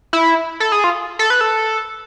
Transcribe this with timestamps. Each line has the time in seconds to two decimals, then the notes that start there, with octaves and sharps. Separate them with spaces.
0.13 E4
0.60 A4
0.72 G#4
0.84 F4
1.19 A4
1.30 B4
1.41 A4